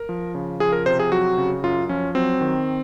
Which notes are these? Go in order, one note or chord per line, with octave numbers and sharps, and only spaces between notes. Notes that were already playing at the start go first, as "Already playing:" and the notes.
Already playing: A#4
F3
C#3
F3 G#4
A#4
C3 C5
G#4
F#3 F#4
C#3
F#2 F4
F3 C#4
F#3 C4
D#3